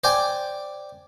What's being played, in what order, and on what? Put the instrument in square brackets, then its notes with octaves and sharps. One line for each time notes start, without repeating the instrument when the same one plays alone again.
[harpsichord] C5 D5 G5 G#5